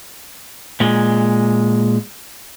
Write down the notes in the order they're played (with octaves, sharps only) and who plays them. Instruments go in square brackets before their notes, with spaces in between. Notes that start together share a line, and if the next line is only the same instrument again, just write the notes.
[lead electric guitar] A#2 G#3